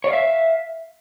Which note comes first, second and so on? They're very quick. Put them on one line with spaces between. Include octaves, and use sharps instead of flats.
C#5 D5 F5 E5